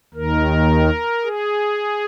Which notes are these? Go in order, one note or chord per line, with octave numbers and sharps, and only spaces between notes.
D#2 D#3 A#4
G#4